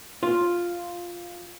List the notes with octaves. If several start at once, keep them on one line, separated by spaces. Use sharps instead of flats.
F4